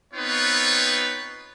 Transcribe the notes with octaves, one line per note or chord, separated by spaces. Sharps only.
B3 C4 D#4 F4 B4 C#5